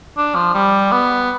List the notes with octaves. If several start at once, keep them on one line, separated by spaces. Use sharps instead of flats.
D4
F3
G3
B3